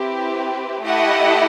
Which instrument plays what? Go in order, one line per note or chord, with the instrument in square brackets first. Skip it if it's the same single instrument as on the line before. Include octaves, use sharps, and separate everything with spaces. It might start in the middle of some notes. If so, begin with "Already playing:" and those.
Already playing: [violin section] C4 E4 G4 B4
A3 E4 G4 D#5 F#5